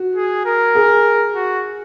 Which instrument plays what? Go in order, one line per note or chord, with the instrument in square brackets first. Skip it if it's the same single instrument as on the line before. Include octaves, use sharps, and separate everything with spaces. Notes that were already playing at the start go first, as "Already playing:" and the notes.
Already playing: [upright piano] F#4
[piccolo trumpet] G#4
A#4
[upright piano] G#4
[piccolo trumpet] F#4